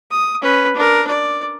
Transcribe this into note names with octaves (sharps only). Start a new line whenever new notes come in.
D#6
C#4 B4
D4 A#4
D5